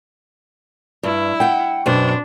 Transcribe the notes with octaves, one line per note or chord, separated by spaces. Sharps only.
G2 E4
F#5 G5
F#2 B2 D4 C5